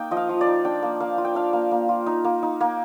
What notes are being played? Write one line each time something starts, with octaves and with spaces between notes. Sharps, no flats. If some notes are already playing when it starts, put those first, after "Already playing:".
Already playing: A#3 D#4 G5
F3 D#5
F5
F3
D5
D#4
D4 G5
A#3
A#3 F5
F4
G5
D4 F5
A#3
A#3
F4
D#4
A#3
D#4
A#3